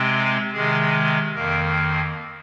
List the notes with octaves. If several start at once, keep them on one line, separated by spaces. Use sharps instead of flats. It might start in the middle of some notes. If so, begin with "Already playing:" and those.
Already playing: C3 G#3 C4
C3 D#3 G#3 G#4
F2 D#3 A#3 A#4